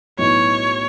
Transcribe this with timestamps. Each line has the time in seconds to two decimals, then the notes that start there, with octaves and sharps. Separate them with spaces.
0.18 B1 A2 E3 B3 D#4 C#5